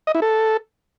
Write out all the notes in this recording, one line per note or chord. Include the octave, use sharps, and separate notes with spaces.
D#5
E4
A4